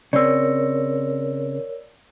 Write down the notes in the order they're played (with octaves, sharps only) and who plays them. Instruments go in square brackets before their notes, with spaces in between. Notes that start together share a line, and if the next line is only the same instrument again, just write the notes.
[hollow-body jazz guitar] C#3 C4 [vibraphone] A#4 C#5 [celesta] D5 E6